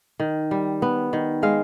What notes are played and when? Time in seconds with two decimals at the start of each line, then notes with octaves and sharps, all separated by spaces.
0.20 D#3
0.51 G3
0.82 B3
1.13 D#3
1.43 G#3 F5